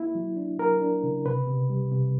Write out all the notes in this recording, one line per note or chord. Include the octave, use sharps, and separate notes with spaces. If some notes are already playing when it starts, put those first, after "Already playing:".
Already playing: A#3 E4
F#3
D4
F#3 A#4
D4
C#3
C3 B4
C3
G3
C3